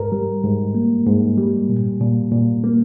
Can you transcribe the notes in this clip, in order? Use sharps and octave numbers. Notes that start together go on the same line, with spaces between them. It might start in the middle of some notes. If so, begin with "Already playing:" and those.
Already playing: G#2 A#4
G3
G#2
A#3
G#2
G3
A#2
A#2
A#2
A#3